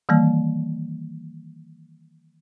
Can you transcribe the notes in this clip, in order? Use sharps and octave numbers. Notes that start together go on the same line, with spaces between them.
D#3 E3 G3 A#3